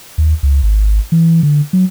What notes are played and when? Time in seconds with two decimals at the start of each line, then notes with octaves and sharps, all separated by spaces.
0.18 D#2
0.43 C#2
0.63 G#1
1.12 E3
1.43 D3
1.73 F#3